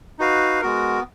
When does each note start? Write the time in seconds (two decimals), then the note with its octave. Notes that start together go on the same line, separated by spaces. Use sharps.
0.19 D#4 F#4 B4 F5
0.61 G#3 B3 F#4 A#4